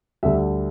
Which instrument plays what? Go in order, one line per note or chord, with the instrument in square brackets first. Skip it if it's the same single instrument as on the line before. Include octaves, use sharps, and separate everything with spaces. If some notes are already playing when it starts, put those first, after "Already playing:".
[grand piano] D2 D3 G3 E5